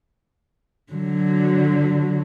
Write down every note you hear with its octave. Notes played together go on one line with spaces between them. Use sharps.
D3 F#3